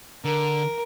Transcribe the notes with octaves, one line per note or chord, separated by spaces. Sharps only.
D3 A#4